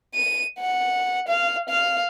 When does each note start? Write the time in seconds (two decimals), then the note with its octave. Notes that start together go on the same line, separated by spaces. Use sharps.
0.15 D#7
0.59 F#5
1.28 F5
1.69 F5